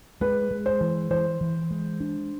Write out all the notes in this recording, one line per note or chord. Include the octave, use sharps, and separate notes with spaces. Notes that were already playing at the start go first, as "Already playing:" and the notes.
G#3 B4
G#3
C5
E3
E3 C5
E3
G#3
D4